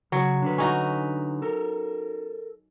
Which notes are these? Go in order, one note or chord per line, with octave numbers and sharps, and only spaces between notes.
C#3 F#3 C#5
D3 D4 B4
C#4 D#4 F#4
A4 A#4